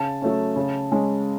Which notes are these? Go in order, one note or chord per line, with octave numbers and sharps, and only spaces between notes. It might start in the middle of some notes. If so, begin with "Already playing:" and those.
Already playing: C#3 A5
F#3 A3 C#4
C#3
G#3 C#4